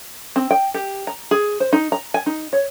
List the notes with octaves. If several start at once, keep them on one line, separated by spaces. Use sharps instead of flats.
C4
G5
G4
A#5
G#4
C5
D#4
A#5
G#5
D#4
C#5